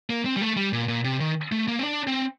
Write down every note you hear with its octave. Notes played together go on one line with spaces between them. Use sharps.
A#3
C4
G3
A3
G3
A#2
A#2
C3
D#3
A3
A#3
C4
D4
C4